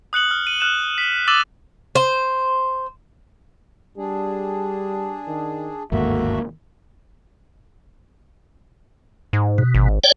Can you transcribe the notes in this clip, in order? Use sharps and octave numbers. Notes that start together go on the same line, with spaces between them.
D#6 F#6 C#7 F#7
F6
D#7
F6 F#6 E7
B6
D6 E6 A6 D#7 E7 F#7
C5
G3 D4 G#4
D#3
G1 D#2 G#2 A3 A#3 F#4 E5
G#2
B2
G#1
C#5 D5 G5